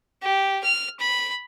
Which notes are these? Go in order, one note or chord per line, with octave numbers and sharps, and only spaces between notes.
G4
F6
B5